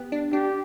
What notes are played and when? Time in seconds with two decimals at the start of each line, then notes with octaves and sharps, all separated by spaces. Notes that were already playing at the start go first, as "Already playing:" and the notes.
Already playing: B3 G4
0.12 D4
0.33 D4 G4